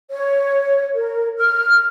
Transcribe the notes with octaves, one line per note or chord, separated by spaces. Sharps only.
C#5
A#4
F6